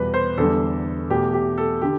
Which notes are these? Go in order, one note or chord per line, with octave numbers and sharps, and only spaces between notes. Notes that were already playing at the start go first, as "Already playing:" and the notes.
Already playing: E2 B2 G3 B4
C5
E2 D3 G3 A4
E2 B2 A3 G4
G4
A4
D3 G4